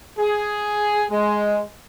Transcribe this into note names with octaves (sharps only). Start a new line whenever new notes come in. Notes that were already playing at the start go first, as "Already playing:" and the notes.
G#4
G#3